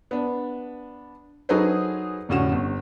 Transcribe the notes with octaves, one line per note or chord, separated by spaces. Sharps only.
B3 D4
F#3 D#4 G#4 A4 B4 C5
F1 A2 D3 C#4 F#4 E7
G1